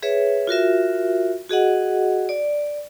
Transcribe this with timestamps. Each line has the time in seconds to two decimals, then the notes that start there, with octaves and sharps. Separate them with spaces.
0.02 G#4 B4 C#5 E5
0.47 F4 F#4 A#4 E5
1.49 F#4 G#4 D#5 F#5
2.29 D5